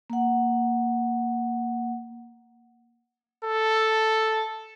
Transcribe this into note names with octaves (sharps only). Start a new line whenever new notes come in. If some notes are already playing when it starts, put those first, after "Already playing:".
A#3 F#5
A4